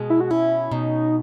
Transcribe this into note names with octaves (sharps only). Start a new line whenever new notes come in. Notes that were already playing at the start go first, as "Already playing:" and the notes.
Already playing: B2 G#3
E4
F#4
C#4 E4
B2 D#4